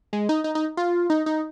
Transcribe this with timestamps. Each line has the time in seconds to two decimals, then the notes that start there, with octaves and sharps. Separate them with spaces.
0.13 G#3
0.29 D#4
0.44 D#4
0.55 D#4
0.77 F4
1.10 D#4
1.26 D#4